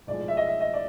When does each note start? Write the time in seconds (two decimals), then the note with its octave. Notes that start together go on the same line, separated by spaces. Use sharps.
0.07 B1 A2 F3 G#3 D5
0.28 E5
0.37 D#5
0.47 E5
0.61 D#5
0.74 D5